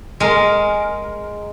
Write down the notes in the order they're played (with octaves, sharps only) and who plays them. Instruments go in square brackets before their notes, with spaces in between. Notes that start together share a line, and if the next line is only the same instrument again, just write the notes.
[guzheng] G#3 A#4